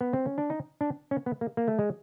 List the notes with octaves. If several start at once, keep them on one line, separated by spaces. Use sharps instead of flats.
B3
C4
C#4
D4
D#4
D4
C#4
B3
A#3
A#3
A3
G#3